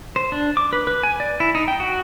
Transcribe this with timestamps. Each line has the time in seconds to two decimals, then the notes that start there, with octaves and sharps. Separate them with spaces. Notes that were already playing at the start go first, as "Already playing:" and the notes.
0.16 C5
0.32 D4
0.57 D6
0.73 B4
0.87 B4
1.03 G#5
1.20 D5
1.40 E4
1.55 D#4
1.68 G5
1.80 F#4